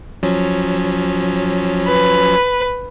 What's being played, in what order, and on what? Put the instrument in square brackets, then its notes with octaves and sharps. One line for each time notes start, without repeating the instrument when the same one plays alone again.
[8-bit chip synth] F3 F#3 C#4
[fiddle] B4